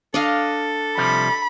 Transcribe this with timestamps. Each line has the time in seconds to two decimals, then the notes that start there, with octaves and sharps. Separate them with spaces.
0.14 D4 A4 D#5 F5
0.97 C3 F3 G3 B5